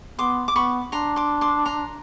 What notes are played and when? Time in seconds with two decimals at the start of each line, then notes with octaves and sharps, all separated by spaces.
0.18 B3 C6 D6
0.48 D6
0.55 B3 B5 C#6
0.92 D4 A#5 C6
1.16 C6 D6
1.41 C6 D6
1.65 A#5 C6